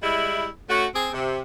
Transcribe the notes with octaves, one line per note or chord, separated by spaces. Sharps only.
G3 G#3 E4
A3 C#4 F#4
C4 G#4
C3